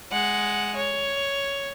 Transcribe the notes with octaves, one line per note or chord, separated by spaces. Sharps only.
G#3 F#5
C#5